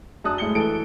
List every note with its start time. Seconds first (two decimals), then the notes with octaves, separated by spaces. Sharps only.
0.24 F#2 D4 A5 D#6 F#6
0.38 A2 G#3 C#7 G7
0.55 E3 A4 D7